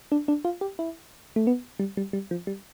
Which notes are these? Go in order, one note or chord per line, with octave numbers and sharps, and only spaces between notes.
D4
D4
F4
G4
E4
A3
B3
G3
G3
G3
F3
G3